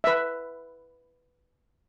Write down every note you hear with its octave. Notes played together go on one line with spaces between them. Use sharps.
B4 E5